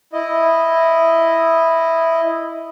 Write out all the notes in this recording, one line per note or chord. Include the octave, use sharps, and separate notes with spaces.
E4 D#5